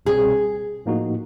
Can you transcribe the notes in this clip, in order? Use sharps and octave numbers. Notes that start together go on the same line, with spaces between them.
C2 B2 G3 C4 G#4
A2 F3 A#3 D#4 F#4